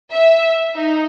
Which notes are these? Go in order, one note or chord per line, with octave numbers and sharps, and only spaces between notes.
E5
D#4